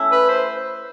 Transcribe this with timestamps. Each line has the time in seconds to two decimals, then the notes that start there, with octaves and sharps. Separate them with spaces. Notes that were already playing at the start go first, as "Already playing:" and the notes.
Already playing: A3 C#4 E4
0.12 B4
0.29 C5